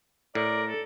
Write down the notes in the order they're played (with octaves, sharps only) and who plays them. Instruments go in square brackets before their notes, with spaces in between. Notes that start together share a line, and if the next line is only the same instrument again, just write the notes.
[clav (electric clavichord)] A2 [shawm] A#4 [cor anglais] D5
[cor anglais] A4